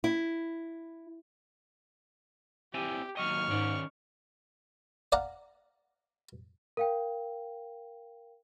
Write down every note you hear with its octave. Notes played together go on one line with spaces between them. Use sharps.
E4
C4 E4 G4 G#5
D#2 F#3 D#5 C#6 F6
G#2 D#3 C#4 D5
D5 F5 F#5 A#5
A#4 F5 G5